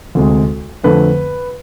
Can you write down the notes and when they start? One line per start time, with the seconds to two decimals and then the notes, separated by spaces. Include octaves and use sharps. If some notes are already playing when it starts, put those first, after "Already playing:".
0.15 D2 C3 G#3
0.84 F2 D3 A3 C4 B4